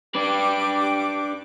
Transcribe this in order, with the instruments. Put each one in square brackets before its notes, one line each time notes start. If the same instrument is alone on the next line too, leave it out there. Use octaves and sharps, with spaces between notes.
[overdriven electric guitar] D4 B4 [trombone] G4 [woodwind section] D6